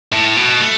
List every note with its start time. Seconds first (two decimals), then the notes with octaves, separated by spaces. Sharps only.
0.12 A2
0.36 B2
0.61 A3